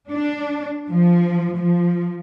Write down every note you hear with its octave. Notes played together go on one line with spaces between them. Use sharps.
D4
F3
F3